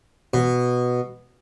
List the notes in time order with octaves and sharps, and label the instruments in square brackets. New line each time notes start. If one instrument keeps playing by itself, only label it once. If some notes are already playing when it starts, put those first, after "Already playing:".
[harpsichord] B2